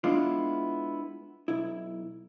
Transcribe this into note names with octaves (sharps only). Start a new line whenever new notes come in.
G#3 B3 D4 E4 F4
B1 E4